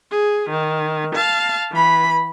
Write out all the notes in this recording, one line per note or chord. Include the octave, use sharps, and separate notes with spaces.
G#4
D#3
F5 A5
E3 B5